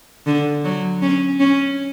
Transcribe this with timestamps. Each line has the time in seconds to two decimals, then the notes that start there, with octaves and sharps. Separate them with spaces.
0.27 D3
0.65 F#3
1.02 C#4
1.40 C#4